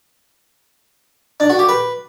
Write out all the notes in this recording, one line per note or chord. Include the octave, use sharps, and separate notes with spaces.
D4
F#4
G4
B4